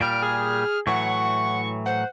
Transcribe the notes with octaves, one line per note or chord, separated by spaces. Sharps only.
A#2 G3 F6 D7
G#4
A2 E3 F#3 F#5 C#6
C5 F#5